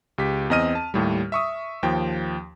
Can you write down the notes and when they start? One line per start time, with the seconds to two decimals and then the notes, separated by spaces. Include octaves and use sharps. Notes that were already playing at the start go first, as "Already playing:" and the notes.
0.18 C#2 G4 B6
0.50 E2 C4 D#5 F6 D#7
0.75 A5
0.94 D#2 A2 G3
1.32 E5 C#6 D#6
1.83 D#2 F3 G5